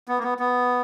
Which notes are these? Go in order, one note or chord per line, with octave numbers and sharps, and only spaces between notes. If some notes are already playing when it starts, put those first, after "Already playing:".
B3
A#3
B3
B3